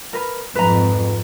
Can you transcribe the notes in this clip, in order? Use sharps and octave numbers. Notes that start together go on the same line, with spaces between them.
A#4 B4
F2 G#2 B4 A#5